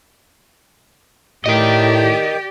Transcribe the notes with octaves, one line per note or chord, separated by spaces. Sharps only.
A2 G4 A#4 D5 D#5